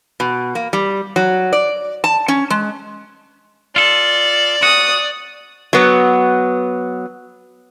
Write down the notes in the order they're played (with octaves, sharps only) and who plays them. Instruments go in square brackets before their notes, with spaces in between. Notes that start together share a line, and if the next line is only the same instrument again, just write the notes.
[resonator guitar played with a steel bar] B2
A#3
G3
F#3
D5
A5
C#4
G#3
[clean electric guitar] F4 A4 [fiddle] D5
[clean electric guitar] F#4 [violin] D#6
[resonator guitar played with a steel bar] F#3 B3